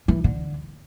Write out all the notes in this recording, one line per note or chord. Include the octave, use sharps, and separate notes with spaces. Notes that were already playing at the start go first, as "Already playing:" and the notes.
E3
D3